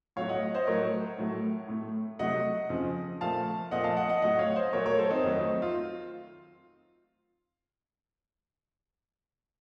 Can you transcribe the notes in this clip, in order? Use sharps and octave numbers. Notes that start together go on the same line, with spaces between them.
A2 F#3 A3 C#5 F5
D#5 F#5
C5 D#5
A2 F#3 A3 A#4 C#5
A2 F#3 A3
A2 A3
C3 F#3 A3 D#5 F#5
F2 C#3 F3
A#2 F3 A3 F5 A5
A#2 F3 A3 D#5 F#5
F5 A5
D#5 F#5
D#5 F#5
A2 F#3 A3 D#5 F#5
C#5 F5
C5 D#5
A#2 F#3 A3 A#4 C#5
A#4 C#5
A4 C5
C4 D#4
F2 D#3 F#3 A3
F4